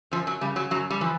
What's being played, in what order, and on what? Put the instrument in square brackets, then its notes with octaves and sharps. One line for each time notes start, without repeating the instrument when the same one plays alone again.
[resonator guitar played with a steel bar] F#2 F3
F#3
C#3 G3
F#3
F#2 F#3
G3
E3 F3